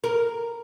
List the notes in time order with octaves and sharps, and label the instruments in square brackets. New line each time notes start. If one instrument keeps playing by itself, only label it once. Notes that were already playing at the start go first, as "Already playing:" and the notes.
[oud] A#4